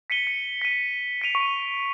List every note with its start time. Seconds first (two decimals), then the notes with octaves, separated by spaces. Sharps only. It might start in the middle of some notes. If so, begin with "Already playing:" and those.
0.10 B6 C#7 D#7 G7
0.27 C#7
0.61 B6 D#7
1.21 B6 D7 D#7 F7
1.35 C#6